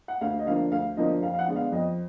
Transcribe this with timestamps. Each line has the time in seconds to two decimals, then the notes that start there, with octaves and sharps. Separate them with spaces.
0.08 F#5
0.21 D2 F5
0.39 D#5
0.46 D3 F3 A#3 D4 F5
0.72 D2 F5
0.97 D3 F3 A#3 D4 D#5
1.22 F2 F5
1.34 F5
1.39 F#5
1.47 D3 G#3 B3 D4
1.56 F5
1.72 F2 D#5